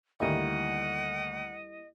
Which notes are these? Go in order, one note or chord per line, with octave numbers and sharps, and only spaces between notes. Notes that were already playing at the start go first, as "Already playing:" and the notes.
D2 D#3 G3 A#3 E4 D#5 F#5